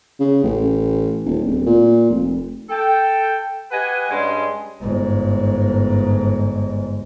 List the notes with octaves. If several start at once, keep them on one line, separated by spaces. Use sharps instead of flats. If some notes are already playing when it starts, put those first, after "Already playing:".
C#3
A1
D#1
D1
A#2
F1
A4 G5
G4 B4 D#5 F#5 G#5
G2 G3 G#3 C#4 G#5 C6
G1 G#2